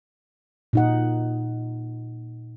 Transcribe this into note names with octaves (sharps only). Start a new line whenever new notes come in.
A#2 D#4 F#5